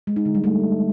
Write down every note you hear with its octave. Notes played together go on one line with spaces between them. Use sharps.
G#3
D#4
D3
G3
A3